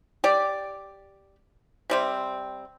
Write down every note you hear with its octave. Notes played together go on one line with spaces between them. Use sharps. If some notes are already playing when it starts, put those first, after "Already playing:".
G4 D5
C3 G3 C4